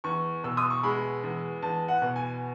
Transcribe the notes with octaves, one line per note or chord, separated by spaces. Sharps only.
E2 C#6
B2 E6
D#6
C#6
G#3 B5
E2
E2 A5
F#5
B2
G#5